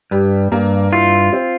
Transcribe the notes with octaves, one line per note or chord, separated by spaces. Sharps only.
G2 G3
G2 A#3
E4 F4
C4